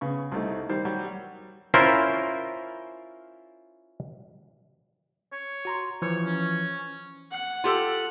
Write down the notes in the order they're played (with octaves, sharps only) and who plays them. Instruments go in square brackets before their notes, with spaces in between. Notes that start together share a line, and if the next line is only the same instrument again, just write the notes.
[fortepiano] C#3 B3 C#6
C2 A3 D#4
D#3 G3 C5
F#3 G3
[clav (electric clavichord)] C#4 E4 F4 A#4 C5
[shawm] C#5
[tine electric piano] F#4 A#5 C6
[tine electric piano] E3 F3 [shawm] C#5
[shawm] C#4
[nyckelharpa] F#5
[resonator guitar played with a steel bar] F4 G4 A4